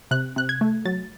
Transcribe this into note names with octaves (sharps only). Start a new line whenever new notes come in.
C3 F#6
C3 F#6
G#6
A3
F#3 A6